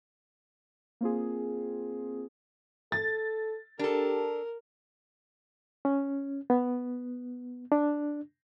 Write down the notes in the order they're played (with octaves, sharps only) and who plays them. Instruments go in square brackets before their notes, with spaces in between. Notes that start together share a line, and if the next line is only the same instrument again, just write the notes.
[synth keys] A#3 C4 F4 G#4
[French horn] A4 [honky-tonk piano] A6
[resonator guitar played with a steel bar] D4 A4 [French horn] G4 [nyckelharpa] A#4
[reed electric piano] C#4
B3
D4